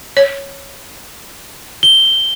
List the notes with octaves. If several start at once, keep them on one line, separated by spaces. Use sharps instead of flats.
C#5
G7